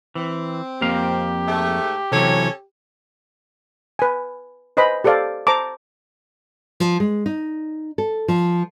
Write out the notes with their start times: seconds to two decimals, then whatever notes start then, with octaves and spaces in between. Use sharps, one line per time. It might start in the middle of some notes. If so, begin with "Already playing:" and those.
0.15 E3 C4
0.81 F2 A#3 G4 F5
1.46 G#2 A3
2.12 C3 E3 F#3 C#4 A4 C#5
3.99 B4 G#5
4.77 B4 C5 D#5 G#5 B5
5.04 G4 A4 C5 D5 F5
5.47 C5 A5 A#5 D6
6.80 F3
7.00 G#3
7.26 D#4
7.98 A4
8.28 F3